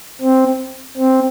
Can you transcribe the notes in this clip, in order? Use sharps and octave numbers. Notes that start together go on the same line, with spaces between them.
C4
C4